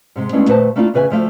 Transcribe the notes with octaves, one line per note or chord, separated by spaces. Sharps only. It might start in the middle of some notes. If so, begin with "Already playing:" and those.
G#2 C3 G#3
G#3 A3 B3 C#4 D4 E4
D#2 A#2 A3 B4 C5 A5
A3 A#3 D4 E4 F4
E2 C#3 B4 E5 G#5
D2 F3 A3 D5 F5